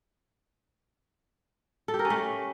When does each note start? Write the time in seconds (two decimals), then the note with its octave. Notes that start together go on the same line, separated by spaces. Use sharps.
1.88 A4
1.94 G4
1.99 A#4
2.05 C#4
2.10 A3